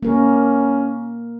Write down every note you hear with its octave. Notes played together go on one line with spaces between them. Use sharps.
A#3 C#4 A#4